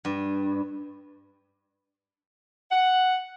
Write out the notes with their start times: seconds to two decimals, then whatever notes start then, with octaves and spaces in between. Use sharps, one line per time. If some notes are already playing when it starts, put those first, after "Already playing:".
0.05 G2
2.71 F#5